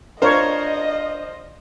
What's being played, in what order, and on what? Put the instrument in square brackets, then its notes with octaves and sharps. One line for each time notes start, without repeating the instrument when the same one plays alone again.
[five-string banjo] D4 [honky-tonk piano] F4 C5 [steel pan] A#4 C#5 [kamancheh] D#5